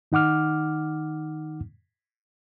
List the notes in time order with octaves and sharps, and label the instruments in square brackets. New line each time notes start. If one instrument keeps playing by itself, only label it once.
[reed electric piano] D#3 D#4 F#5 D6 F6